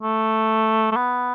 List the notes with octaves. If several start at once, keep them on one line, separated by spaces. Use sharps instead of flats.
A3
A3
B3